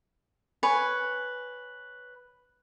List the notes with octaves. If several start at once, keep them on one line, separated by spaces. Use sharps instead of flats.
B4 C#5 G#5